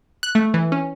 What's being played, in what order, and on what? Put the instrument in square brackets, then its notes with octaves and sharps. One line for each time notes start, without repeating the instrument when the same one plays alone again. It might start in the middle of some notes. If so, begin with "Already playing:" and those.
[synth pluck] F#6
A3
E3
C#4